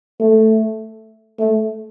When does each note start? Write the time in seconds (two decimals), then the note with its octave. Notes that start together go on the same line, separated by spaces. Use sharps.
0.20 A3
1.40 A3